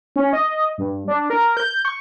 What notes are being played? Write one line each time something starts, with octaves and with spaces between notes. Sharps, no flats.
C#4
D#5
G2
D4
A#4
G6
C#6